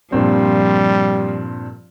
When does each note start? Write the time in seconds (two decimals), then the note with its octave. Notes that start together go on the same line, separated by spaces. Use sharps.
0.12 G2 A#2 F3 G3 C4